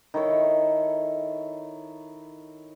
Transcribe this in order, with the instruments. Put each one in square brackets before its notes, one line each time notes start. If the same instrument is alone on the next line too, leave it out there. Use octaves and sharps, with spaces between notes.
[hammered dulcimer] D#3 E4 A4 C#5